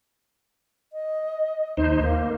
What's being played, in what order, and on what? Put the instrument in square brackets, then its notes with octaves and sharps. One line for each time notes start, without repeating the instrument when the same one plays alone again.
[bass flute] D#5
[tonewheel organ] D#2 D#4 C5
[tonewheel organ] A#3 [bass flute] F5